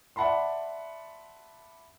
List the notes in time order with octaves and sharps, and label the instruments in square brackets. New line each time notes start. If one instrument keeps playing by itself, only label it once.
[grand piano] D5 E5 F#5 A5 B5 C6